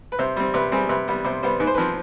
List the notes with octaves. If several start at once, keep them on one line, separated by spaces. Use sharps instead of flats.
B4
C3 C5
G3 C4
C3 B4
G3 C4 G#4
C3 B4
G3 B3
C3 C5
G3 B3 C5
G#2 B4
C5
B4
F3 C4